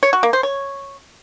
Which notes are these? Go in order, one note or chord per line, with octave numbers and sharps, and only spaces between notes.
C#5
F#4
A#3
C5
C#5